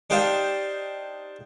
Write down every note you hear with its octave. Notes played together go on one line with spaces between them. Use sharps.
D4 D#4 G4 C5 F5 A5